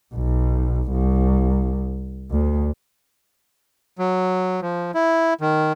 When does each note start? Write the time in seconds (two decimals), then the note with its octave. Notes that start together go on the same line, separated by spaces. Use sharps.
0.15 B1
0.92 C2
2.31 D2
3.99 F#3
4.61 F3
4.95 E4
5.41 D#3